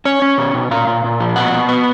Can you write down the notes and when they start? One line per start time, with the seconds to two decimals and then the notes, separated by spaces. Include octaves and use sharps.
0.05 C#4 C#5
0.22 C#4
0.38 B2
0.54 B2
0.71 A#2 F5
0.87 A#2
1.04 A#2
1.20 F3
1.36 B2 F#5
1.52 B2
1.69 B3